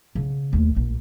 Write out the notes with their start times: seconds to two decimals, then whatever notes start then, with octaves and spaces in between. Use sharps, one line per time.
0.15 C#3 B3
0.53 D#2 A3
0.76 A#1